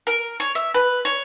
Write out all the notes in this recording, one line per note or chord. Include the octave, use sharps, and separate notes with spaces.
A#4
C#5
E5
B4
C#5